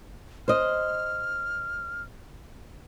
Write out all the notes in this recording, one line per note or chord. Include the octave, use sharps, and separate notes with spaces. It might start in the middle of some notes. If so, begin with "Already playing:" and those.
C5 D#5 F6